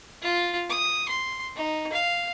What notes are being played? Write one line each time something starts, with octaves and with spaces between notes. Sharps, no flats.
F4
D#6
C6
D#4
F5